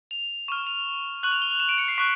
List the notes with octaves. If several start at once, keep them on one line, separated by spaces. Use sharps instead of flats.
F7
C#6 F6 E7
F7
C#6 F#6 F#7
F7
G7
F7
E7
D7
C#7
C7
C#6 F#6 B6